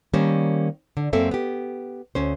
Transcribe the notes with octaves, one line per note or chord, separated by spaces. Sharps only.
D#3 G3 A#3 C#4 C5
D3
F#2 A#3 C4 A4 C5 E5
B3 G4
D2 C#4 C5